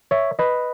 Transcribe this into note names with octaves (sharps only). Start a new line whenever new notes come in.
C#5 E5
B4 D#5